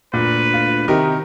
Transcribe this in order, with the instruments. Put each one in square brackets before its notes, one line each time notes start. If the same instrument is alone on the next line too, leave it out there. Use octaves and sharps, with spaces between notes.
[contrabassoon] D2 [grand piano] A#2 [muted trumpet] B4
[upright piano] F4
[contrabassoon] C3 [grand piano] D#3 A#4 [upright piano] D#4 G4